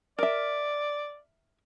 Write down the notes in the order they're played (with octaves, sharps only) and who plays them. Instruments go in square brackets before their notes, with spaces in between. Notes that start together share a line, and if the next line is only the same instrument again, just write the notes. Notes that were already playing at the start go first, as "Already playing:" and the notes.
[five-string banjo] A#4 E5 [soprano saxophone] D5